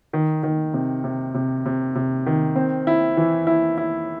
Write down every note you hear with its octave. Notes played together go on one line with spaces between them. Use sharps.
D#3
D#3
C3
C3
C3
C3
C3
D#3
C4
E4
E3
E4
E4